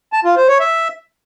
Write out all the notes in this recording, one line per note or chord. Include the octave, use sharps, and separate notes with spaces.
A5
F4
C5
C#5
E5